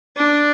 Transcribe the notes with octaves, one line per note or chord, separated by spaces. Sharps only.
D4